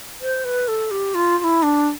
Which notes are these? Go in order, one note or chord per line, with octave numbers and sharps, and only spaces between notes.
C5
B4
A4
G4
F4
F4
E4
D4